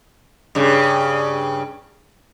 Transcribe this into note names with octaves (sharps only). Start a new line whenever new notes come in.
G2 C#3